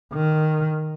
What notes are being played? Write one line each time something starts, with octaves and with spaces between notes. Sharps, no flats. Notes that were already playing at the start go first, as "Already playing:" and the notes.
D#3